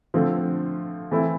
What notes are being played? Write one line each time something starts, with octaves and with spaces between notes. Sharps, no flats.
D3 F3 A3 C4
E3 A3 C4 E4